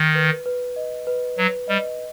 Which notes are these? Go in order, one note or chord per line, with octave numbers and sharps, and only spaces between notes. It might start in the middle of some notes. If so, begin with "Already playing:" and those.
Already playing: D#3
B4
B4
D#5
B4
F#3 B4
G3 D#5